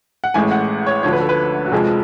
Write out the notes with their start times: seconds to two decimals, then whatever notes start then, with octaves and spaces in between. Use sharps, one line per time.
0.24 F#5
0.34 A1 A2 G#3 G#5
0.51 F#5
0.86 C#5
1.03 D2 D3 F3 C#5
1.13 B4
1.20 A4
1.29 B4
1.66 F#4
1.72 F1 F2 F3 G#3 G#4